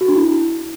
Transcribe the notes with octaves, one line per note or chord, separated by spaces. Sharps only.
F#4
D4
E4